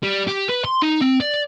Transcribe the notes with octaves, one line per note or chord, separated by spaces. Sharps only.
G3
G4
B4
C6
D#4
C4
D5